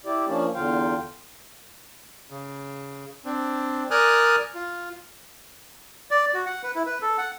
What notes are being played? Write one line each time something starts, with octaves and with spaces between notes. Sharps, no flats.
E4 G4 D5
F3 A#3 C#4 D4
E2 D3 F4 F5 G5
C#3
C4 D4
A#4 D5 G#5 D#6 F6 F#6
F4
D5
F#4
F#5
B4
E4
B4
A4
F#5